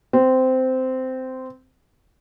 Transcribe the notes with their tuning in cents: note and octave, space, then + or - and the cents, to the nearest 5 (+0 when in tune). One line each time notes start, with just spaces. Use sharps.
C4 -15